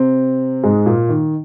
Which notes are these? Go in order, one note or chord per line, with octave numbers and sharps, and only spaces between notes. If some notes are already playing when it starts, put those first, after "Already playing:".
Already playing: C3 C4
G#2 G#3
A#2 A#3
D#3